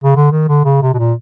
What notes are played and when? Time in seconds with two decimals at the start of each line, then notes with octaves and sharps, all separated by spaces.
0.04 C#3
0.16 D3
0.32 D#3
0.48 D3
0.65 C#3
0.82 C3
0.94 B2
0.98 A#2